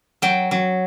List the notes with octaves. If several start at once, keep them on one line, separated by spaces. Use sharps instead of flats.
F#3 G5
F#3